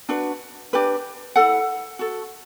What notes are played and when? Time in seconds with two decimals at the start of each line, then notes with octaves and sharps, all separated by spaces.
0.09 D4 F#4 B4
0.73 D4 G4 B4
1.36 E4 A4 F#5
1.99 F#4 A4